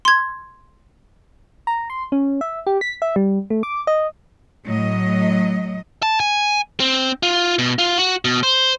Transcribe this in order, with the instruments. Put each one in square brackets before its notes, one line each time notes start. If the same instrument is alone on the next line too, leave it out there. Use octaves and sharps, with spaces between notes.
[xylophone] C6 G#6
[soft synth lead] A#5
C6
C#4
E5
G4
B6
E5
G3
A3
D6
D#5
[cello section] A2 F#3 D#5
[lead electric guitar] A5
G#5
C4
F4
B2
F4
F#4
B2
C5